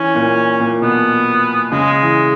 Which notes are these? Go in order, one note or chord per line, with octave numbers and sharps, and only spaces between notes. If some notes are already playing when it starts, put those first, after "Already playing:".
Already playing: E3 C#4
A#2
A#2
B2 B3
C#3 G#3
E3